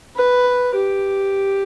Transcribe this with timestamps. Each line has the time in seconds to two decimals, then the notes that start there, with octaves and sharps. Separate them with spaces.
0.15 B4
0.75 G4